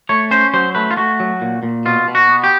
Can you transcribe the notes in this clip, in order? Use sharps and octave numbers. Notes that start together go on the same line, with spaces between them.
A3 C#5
C#4 C5
F#3 C5
A3 B4
F4
A3 F#4
F#3
A#2
A#2
B2 F4
B2
F#4
B3
G4